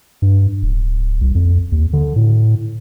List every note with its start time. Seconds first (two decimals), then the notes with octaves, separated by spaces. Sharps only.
0.22 G2
0.63 D1
1.21 C2
1.35 F2
1.72 D#2
1.93 D3
2.16 A2